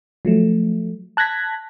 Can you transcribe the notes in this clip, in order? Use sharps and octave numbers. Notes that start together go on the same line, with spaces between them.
F3 F#3 A3
A5 F#6 G#6 A#6 B6